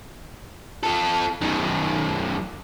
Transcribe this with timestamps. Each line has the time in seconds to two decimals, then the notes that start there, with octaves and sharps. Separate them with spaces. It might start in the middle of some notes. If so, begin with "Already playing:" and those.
0.83 F4 A4
1.41 F#2 D#3